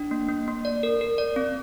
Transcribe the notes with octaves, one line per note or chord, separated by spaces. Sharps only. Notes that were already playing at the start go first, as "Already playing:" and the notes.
Already playing: D4
A#3
A#3
A#3
D5
A#4
A#4
D5
C4